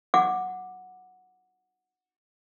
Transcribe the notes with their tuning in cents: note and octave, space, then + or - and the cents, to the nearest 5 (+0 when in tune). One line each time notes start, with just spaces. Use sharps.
F#5 -10 D6 +10